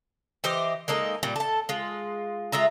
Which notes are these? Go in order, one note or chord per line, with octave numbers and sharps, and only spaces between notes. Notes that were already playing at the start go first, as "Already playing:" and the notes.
E3 G4 C5 D#5
G#3 A#3 D#4 A4
A#2 G3
A4 A5
G#3 F4
G#3 F4 E5 A#5